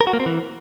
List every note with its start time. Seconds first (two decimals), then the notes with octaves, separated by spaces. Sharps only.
0.01 A#4
0.07 F#4
0.13 A#3
0.20 C4
0.26 E3